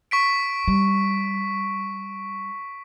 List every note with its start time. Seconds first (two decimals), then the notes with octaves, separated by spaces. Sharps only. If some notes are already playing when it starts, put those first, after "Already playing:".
0.11 C#6 B6 D7
0.68 G3